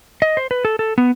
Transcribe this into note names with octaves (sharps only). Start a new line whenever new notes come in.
D#5
C5
B4
A4
A4
B3